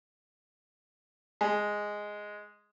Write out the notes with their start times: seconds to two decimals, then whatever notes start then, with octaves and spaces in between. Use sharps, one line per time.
1.41 G#3